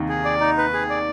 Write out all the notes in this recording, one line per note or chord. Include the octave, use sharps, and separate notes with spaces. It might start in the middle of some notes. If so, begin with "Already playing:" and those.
Already playing: D#2 C3 D#3
G#4
D5
D#4
B4
G#4
D5